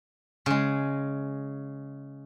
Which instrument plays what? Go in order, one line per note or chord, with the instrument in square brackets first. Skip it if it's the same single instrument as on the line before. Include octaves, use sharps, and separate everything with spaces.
[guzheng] C#3 G#3